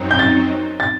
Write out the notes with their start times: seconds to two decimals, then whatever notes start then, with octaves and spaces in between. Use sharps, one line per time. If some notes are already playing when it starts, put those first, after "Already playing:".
Already playing: F#2 F#3 C4 D#4
0.11 G6
0.19 A6
0.80 A6